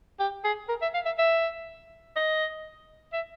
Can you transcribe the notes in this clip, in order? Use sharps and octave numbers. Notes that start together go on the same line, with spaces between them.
G4
G#4
A#4
E5
F5
E5
E5
D#5
E5